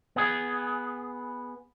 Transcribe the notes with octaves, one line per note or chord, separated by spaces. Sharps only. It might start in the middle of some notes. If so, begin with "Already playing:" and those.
B3 G#4